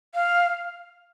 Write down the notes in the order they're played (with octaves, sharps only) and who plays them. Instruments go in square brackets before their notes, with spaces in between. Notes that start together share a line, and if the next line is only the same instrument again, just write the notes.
[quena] F5